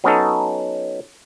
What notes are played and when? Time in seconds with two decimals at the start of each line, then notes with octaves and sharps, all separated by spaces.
0.04 F#3 B3 C#4 D#4 A4